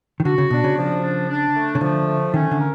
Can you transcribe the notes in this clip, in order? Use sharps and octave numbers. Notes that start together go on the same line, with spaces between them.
D#3
D3 F#4
C#3
B2 D4
C#3
F3
D4
D4
A3
C#3
D3 F3
A3
D#3 C#4
D3
A#4